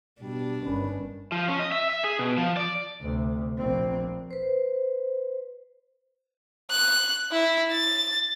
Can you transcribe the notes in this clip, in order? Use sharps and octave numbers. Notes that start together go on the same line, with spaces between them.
B2 G3 D4
G1 D#3 C#4 B4
F3
C#4
D#5
E5
E5
G#4
B2
F3
D5
D2 C3
A#1 C4
B4 C5
F#6
E4
A6